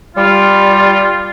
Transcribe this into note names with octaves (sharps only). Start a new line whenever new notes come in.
G3 F4